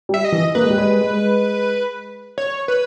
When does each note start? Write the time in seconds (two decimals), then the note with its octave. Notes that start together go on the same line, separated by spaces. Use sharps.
0.09 G3
0.14 E5
0.24 D#5
0.32 E3
0.55 A#3 B4
0.63 G#3
0.70 G3
0.78 G#3
1.01 G#3
2.38 C#5
2.68 B4